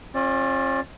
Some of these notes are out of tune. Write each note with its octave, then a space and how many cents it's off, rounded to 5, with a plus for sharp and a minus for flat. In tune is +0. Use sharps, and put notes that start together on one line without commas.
C#4 -45 F4 +0 D5 +0